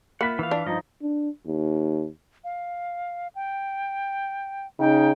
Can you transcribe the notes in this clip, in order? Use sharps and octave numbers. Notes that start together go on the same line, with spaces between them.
A#3 F4 E5 F#5 B5 B6
E3 F5
D4
G2 F3 D#4 D#5
D4
D#2
F5
G5
C#3 D#4 G5